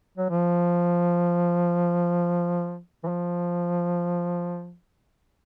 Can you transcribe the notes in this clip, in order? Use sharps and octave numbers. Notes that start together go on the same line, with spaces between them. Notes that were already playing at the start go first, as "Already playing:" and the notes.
F#3
F3
E3
F3